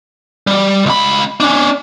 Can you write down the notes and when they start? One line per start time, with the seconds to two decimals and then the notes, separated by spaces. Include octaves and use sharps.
0.47 G3
0.86 C#2 B5
1.40 C#4 D4